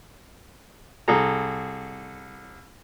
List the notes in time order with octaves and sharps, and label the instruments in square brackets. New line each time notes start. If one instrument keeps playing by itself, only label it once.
[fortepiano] C2 G#4 A4 A#5